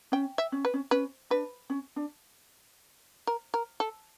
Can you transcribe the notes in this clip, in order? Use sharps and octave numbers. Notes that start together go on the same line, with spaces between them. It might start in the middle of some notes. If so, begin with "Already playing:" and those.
C#4 G5
E5
C#4
B4
C#4
C#4 B4
D4 B4
C#4
D4
A#4
A#4
A4